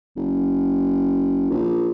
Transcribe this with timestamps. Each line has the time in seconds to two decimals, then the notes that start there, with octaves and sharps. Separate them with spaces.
0.16 F#1
1.51 A#1